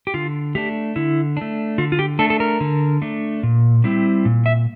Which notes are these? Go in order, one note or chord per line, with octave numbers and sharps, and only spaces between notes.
G4
D3 F4
A3 D4 G4
D3 E4
A3 D4
D3 F4
F4
G4
A3 D4 A4
A4
A#4
D3
A3 D4
A#2
G3 C4 E4
A#2
E5